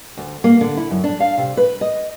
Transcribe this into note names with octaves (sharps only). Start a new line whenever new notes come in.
D2
A#3
D3
E4
F#2
D4
F5
C3
B4
D#5